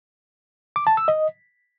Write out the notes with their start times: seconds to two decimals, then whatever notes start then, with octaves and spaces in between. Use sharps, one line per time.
0.76 D6
0.87 A5
0.97 E6
1.08 D#5